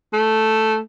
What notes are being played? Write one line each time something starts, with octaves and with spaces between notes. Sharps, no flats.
A3